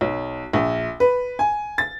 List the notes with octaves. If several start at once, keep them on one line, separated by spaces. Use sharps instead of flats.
B1
A#1
B4
G#5
A6